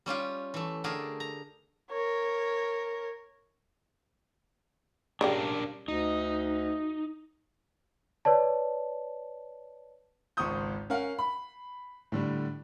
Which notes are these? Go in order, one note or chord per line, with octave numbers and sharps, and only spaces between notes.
G3 C#4 F4 G4
E3 A3
D3 A3 G4 G#4 A#4
A#5
A#4 C#5
C#3 G3 D4 G4 A#4 F5
D2 D#4
B4 C#5 D5 A5
G#1 C#2 C5 C#6 D#6 G6
C#4 A#4 F5 F#5
B5
A2 D3 G3